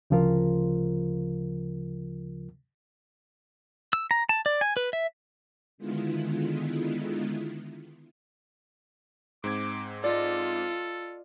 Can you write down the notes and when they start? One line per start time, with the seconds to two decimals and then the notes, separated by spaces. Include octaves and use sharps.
0.10 D2 C#3 F3 F4 A#4
3.93 E6
4.11 A#5
4.29 A5
4.46 D5
4.61 G#5
4.77 B4
4.93 E5
5.78 D3 D#3 G#3 B3 E4 F4
9.44 G#2 C4 D6 G#6
10.04 F4 A4 D5 D#5